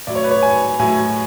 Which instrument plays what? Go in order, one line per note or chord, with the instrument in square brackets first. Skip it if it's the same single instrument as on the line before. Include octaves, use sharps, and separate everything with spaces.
[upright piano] A2 F#3 D5
C#5
B4
C#5
G#5
A2 F#3 G#5